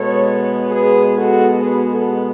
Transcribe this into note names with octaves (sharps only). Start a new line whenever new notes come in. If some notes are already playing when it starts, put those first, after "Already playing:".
Already playing: B2 G#3 B3 A4 C#5
G#4 B4
F#4 A4
G#4 B4
F#4 A4